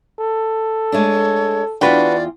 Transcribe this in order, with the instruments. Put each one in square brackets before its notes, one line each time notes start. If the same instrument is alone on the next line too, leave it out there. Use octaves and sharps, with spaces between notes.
[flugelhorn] A4
[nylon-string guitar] G#3 A3 D4 [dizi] C#5
[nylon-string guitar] E2 F4 G5 [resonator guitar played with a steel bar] D4 F#4 B4 [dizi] D5